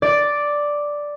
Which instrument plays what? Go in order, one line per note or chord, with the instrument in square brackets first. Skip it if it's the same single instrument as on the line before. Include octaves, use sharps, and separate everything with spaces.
[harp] D5